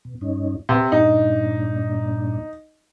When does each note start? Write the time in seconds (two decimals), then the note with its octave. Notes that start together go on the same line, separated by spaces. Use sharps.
0.05 B2
0.21 G2 C#4 D#4
0.69 C3 B4
0.92 G2 A#2 D4 D#4